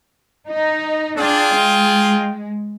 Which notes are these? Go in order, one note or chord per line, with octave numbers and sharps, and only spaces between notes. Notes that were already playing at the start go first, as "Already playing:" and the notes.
D#4
D4 F4 G#4 G5
G#3